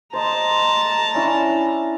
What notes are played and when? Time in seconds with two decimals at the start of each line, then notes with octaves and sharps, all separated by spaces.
0.13 C5 D#5 A5 A#5
1.15 C#4 D4 E4